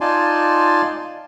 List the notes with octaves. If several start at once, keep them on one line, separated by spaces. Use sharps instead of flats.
D#4 F4 D5 G#5 A5 C6